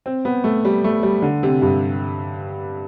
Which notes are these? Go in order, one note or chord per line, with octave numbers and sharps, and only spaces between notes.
C4
B3
A3
G3
A3
G3
D3
C3
G2